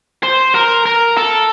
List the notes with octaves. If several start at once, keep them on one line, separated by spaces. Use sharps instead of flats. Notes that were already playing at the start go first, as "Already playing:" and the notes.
C5
A#4
A#4
A4